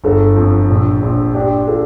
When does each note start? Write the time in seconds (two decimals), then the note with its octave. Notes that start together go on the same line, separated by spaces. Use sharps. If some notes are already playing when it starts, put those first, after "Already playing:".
0.04 G1 A4
0.36 F2
0.70 A#1
1.03 A#1
1.34 D4 G4
1.68 F4 A4